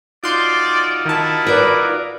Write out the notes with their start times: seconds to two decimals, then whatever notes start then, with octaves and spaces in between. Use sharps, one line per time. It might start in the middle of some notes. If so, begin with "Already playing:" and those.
0.24 D#4 F4 F#4 D5 C6 G6
1.05 D#3 E4 A5
1.46 A#4 B4 D5